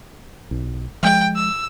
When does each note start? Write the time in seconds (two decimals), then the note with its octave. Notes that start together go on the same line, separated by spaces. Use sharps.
0.51 B1
1.03 F3 G#3 G5
1.36 E6